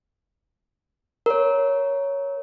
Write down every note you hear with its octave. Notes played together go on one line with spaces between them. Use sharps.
A#4 C#5